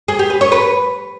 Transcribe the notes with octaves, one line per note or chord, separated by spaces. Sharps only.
G#4
G4
B4
C#5
B4